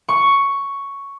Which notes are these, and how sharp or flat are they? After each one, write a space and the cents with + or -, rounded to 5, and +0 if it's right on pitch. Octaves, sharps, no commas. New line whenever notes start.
C#6 +5